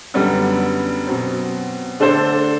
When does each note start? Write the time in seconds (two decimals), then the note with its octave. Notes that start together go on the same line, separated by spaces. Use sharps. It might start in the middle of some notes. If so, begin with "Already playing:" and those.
0.14 F#2 D3 G3 B3
1.07 B2 F#3 C4
2.00 D3 A3 D4 A4 C5